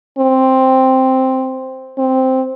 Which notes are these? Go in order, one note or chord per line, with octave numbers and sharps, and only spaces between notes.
C4
C4